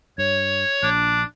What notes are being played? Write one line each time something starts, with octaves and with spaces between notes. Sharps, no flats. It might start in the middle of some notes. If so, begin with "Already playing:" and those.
G2 C#5
A#1 D4